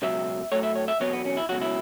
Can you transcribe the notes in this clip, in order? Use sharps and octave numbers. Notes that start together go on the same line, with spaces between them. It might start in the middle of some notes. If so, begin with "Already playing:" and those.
C#2 B2 F#3 E5
A2 F#3 A3 C#5
E5
C#5
E5
E2 B2 F#3 B3 C#5
B3
C#4
E4
C#2 B2 F#3 F#4
E4